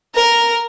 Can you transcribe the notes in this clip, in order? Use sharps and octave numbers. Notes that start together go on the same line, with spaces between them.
A#4